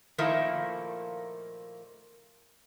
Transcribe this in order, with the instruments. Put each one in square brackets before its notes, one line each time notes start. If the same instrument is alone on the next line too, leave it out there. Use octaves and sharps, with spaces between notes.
[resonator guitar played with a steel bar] A#2 D#3 F3 A3 A#3 E4